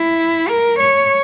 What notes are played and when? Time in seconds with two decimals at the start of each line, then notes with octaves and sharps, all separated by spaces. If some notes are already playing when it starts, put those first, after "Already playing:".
Already playing: E4
0.49 A#4
0.80 C#5